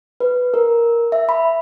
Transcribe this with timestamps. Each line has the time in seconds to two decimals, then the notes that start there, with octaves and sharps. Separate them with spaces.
0.20 B4
0.54 A#4
1.12 E5
1.29 B5